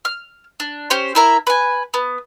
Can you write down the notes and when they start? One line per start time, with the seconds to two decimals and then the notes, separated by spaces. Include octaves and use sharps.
0.05 F6
0.60 D4
0.90 C#4 G4 C5
1.15 E4 A#4 E5
1.47 B4 G#5
1.94 B3